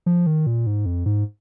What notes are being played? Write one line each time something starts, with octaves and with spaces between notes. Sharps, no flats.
F3
D#3
A#2
G#2
F2
G#2